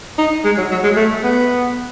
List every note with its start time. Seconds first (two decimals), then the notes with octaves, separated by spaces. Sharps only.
0.18 D#4
0.45 G#3
0.57 F#3
0.71 F#3
0.83 G#3
0.96 A3
1.23 B3